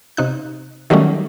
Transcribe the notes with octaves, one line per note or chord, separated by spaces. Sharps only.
C3 D#4 F#6
D#3 F#3 G3 A3 C#4